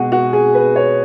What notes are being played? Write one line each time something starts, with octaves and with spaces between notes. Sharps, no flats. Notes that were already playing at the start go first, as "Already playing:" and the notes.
Already playing: B2 G#3 F#4 G#4
F#4
G#4
B4
C#5